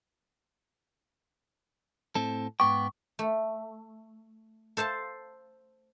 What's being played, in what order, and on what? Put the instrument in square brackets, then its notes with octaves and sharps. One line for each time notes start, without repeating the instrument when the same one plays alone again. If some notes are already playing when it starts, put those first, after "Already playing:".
[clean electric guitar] A2 C4 A4
[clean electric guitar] G#2 B3 G5 [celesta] C#6 D6
[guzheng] A3
A4 C5 F5 A5